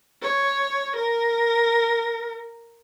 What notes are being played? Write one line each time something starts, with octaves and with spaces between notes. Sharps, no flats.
C#5
A#4